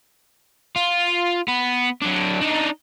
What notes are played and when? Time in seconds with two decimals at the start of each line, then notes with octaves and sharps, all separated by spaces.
0.76 F4
1.48 B3
2.02 F#3 D4
2.41 D4 D#4